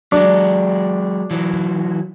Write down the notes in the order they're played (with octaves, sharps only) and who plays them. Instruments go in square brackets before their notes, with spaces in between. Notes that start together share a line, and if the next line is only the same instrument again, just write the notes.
[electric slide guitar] F#3 G#3 [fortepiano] D4
[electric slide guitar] E3 F#3